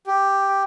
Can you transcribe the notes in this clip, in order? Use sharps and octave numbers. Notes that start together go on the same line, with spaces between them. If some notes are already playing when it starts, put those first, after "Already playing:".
G4